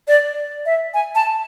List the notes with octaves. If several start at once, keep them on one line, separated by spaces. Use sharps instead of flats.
D5
E5
G#5
A5